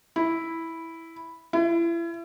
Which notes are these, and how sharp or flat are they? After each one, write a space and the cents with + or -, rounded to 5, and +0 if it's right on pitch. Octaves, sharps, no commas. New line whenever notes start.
E4 -5
E4 +35